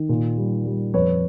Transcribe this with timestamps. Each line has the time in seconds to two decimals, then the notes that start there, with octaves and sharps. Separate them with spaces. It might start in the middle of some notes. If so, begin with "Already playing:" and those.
Already playing: D#3
0.09 A#2
0.37 G3
0.66 G3
0.94 F2 B4 C#5